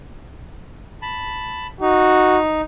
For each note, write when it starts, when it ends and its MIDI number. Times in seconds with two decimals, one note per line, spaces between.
1.02 1.67 81
1.02 1.67 83
1.81 2.62 63
1.81 2.38 66